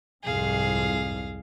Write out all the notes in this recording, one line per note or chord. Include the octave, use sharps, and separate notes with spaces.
C2 F2 G#2 G#4 F5